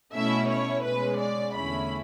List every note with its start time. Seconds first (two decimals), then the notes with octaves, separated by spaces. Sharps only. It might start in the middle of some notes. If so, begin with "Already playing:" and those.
0.14 B2 A3 C#4 E4 E5
0.50 C#5
0.85 B2 G#3 C#4 B4
1.20 D5
1.56 E2 D3 A3 C#4 E4 B5